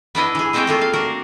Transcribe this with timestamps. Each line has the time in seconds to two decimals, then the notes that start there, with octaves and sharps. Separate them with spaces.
0.15 B3 D4 E4 D#5
0.35 E3 G#4
0.53 G#3 C4 C5 C#5 D#5 G5
0.67 A3 A#3 F4
0.81 F5
0.93 D4 F#4 A#4